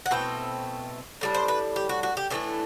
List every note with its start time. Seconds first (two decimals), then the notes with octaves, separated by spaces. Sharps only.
0.06 F#5
0.11 B2 A3 C4 E4 G5
1.21 A2 G3 D4
1.35 C5
1.48 B4
1.76 G4
1.89 F#4
2.03 F#4
2.17 G4
2.30 A2 E3 A3 D4 G4